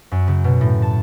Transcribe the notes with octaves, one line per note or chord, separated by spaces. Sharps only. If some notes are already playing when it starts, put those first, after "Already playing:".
F#2
C#3
B2
A2
A5